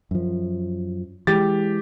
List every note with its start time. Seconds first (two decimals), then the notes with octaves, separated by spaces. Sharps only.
0.11 F#2 F3
1.27 E3 G#3 G4 A6